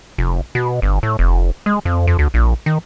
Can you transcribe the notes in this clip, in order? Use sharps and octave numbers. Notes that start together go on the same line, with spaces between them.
F1
B2
G1
A2
F1
G#3
F2
F2
D2
A#1
D#3